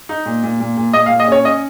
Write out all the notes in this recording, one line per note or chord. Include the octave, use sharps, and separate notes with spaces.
D#4
A#2
A#2
A#2
A#2
A#2 D#5
F5
A#2
D#5
C#4 C#5
C#4 D#5